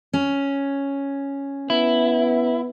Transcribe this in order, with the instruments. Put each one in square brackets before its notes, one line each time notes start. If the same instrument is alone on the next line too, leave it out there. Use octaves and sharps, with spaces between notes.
[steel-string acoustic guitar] C#4
[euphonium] B3 [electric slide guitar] E4